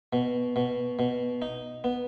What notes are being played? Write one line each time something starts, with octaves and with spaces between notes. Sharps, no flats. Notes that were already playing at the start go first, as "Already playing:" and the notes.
B2
B2
B2
D#4
B3